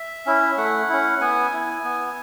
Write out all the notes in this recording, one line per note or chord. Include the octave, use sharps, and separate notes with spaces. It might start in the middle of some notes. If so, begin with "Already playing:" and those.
Already playing: E5
C#4 E4
A3 F#5
C#4 E4
B3 G#5
E4
B3